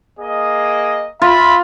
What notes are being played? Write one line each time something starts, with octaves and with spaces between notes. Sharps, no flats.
A#3 G#4 D#5
F4 E5 B5